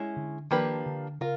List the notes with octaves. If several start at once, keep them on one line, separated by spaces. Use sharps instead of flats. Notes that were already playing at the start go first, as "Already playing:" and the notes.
Already playing: G#3 C#4 E4
D3
D#3 F3 A#3 D4 G4 B4
D3
C#3 F4 A#4